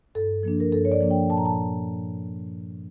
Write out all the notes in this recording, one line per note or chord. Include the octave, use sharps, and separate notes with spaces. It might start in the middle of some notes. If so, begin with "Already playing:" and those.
G2 A4
F3 A#3 D4
A#4
G2 A4
C#5
D5
F3 A#3 D4
G5
A#2 A5
A#5
A5